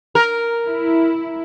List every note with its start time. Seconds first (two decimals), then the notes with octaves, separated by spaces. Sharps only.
0.15 A#4
0.67 E4